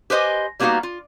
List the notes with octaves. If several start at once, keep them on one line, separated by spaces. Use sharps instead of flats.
G4 B4 C5 D#5 G#5
G3 A#3 B3 D#4 F#4 F5
F4